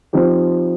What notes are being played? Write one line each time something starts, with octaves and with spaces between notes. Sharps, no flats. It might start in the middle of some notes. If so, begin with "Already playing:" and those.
F3 C4 D#4 G4